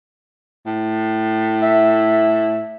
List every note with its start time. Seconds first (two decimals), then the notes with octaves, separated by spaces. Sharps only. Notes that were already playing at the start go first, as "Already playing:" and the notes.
0.67 A2
1.63 E5